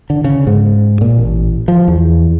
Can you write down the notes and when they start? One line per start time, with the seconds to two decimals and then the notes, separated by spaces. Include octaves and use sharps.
0.10 D3
0.25 C#3
0.47 G#2
1.01 A#2
1.18 A1
1.68 F3
1.88 E2